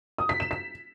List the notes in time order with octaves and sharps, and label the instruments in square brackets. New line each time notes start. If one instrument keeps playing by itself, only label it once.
[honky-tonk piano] D#6
B6
E7
B6